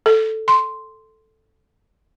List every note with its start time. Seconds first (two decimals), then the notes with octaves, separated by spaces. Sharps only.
0.06 A4
0.48 C6